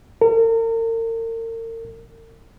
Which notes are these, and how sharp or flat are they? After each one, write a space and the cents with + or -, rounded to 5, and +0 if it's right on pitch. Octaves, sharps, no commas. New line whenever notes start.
A#4 -40